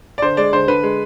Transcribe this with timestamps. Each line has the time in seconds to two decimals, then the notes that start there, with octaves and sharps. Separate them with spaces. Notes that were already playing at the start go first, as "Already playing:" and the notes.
0.18 D5
0.22 D3 C5
0.37 G#3 D5
0.53 D3 C5
0.68 D3 B4
0.83 G#3